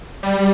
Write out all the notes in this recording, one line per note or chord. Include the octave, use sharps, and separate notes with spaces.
G3